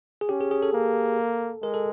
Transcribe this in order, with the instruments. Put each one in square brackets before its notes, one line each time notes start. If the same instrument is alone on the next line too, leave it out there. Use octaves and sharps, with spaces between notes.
[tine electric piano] G#4
[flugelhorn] C#4 [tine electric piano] G4
[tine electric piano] G#4
G#4
A4
[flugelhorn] A#3
[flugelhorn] G#3 [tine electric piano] A#4
[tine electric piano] A4